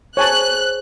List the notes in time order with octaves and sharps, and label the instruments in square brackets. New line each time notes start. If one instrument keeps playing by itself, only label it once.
[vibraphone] G#4 C5 [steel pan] C#5 G#5 A5 [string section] F#6